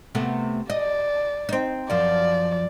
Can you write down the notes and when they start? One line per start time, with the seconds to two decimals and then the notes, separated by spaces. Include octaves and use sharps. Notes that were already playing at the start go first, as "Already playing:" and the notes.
0.15 C3 A3 B3
0.70 D5 D#5
1.49 C4 D#4
1.90 F#2 F3 D5